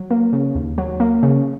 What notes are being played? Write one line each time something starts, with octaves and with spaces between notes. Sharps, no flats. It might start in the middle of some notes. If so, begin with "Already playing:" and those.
Already playing: F#3
A#3
C#3
D#2
F#3
A#3
C#3